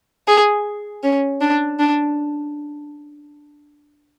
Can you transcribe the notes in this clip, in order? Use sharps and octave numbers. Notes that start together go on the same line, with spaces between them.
G#4
C#4
D4
D4